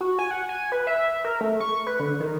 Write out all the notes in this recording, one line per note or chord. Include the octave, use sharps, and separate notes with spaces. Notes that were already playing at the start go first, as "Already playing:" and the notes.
F#4
G#5
F#5
G#5
B4
E5
A#4
A3
C#6
B4
D3
D#3